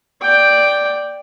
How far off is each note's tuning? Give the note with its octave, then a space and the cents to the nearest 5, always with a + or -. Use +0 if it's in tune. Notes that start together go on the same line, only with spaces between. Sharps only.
D5 +0 G5 +0